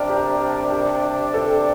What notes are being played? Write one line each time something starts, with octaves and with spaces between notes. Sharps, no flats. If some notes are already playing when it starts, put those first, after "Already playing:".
Already playing: C3 G3 D4 A#4
G4
G4
A4